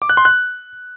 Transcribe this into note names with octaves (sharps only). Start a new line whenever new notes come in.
D6
F#6
C6
F#6